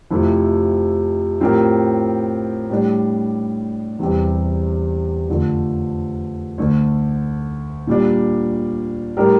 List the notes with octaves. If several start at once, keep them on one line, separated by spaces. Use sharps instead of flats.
F2 C3 F3 A3 E4
A2 F3 C4 G4 A#4
A2 G3 D4
E2 C3 G3 C4 G4
F2 D3 F3 A3
D2 D3 A3
A#2 G3 D4
A2 G3 D4 G4 A#4